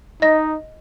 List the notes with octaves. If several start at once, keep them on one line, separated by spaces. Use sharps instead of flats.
D#4 D#5 A#6